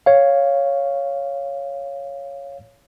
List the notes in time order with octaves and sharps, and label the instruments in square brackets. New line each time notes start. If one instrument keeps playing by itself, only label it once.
[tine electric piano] C#5 F5